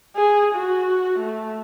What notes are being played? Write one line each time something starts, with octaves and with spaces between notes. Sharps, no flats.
G#4
F#4
A3